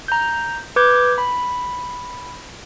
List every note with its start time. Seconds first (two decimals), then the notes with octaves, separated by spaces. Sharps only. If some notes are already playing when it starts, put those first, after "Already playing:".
0.08 A#5 G6
0.76 B4 D6 G6 G#6
1.18 B5